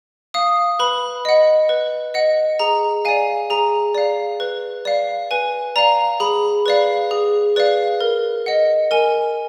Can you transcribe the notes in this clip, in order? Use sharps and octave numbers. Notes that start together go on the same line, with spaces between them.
F5 D#6
B4 B5
D#5 F#5
B4
D#5 F#5
G#4 A#5
D5 F5 G#5
G#4 A#5
D5 F5
B4
D5 F5
B4 G#5
D5 F5 A#5
G#4 B5
B4 D5 F5
G#4
B4 D5 F5
A#4
D#5 F#5
A#4 G#5